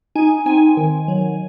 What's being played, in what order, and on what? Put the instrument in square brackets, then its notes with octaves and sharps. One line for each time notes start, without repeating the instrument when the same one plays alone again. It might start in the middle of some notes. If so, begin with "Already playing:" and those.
[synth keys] D#4 G#5
C4 G#5
D#3
F#3